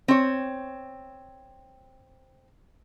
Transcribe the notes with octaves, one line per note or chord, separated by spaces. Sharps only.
C4 C#5